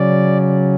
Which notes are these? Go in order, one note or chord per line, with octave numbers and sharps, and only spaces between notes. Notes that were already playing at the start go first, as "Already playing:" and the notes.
Already playing: C#3 F#3 C#4 D5